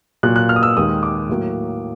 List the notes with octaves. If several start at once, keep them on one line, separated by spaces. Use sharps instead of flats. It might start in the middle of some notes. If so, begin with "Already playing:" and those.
A#2 F#3 A#3 F#6
F#6
F6
D#6
E6
D#2 D#3 G#3 D#6
D6
A2 F#3 A#3